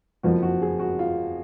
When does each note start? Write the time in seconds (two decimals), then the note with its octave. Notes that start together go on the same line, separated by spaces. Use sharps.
0.23 F#1 F2 F3 F#4
0.43 F#4
0.62 G#4
0.79 F#4
0.99 F4